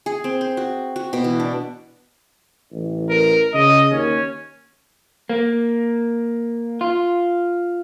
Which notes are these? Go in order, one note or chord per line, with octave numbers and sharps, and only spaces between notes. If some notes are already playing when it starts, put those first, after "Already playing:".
G#4
C4
C5
F#4
F#4
B2
E3
D4
A1
A#4
C#3 D#5
D#2 C#4
A#3
F4